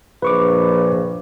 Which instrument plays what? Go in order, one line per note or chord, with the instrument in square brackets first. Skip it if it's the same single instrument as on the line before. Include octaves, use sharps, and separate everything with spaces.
[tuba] A#1 [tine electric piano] B4 C#6 D6